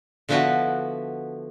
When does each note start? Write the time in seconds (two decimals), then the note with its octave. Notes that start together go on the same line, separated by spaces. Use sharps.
0.29 D3 F3 B3 E4 F#4 B4